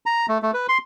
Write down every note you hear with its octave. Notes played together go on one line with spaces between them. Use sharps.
A#5
A3
A3
B4
C6